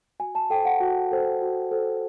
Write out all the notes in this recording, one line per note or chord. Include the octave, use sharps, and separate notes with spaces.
F#4 G#5
A5
A4 C5 G5
F#5
F#4
A4 C5
F#4
A4 C5